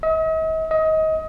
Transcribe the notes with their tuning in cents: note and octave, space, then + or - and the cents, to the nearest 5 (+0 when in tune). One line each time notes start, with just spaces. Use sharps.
D#5 +45
D#5 +25